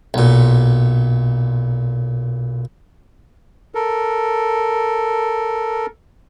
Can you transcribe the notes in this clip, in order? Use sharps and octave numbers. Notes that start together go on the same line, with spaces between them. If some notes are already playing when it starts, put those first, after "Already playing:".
B1 A#2
A4 A#4